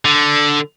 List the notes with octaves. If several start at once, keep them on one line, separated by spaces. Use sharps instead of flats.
D3